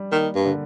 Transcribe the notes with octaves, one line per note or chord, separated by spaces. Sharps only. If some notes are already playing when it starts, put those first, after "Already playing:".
Already playing: G3
D#3 A#3
G2
D3